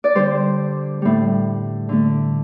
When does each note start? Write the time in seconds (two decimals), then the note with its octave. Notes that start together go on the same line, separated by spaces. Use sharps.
0.04 D5
0.15 D3 G3 C5
1.02 A2 G3
1.89 D3 A3